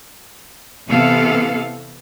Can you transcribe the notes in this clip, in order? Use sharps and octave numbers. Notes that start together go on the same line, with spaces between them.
C3 E3 B3 A4 F5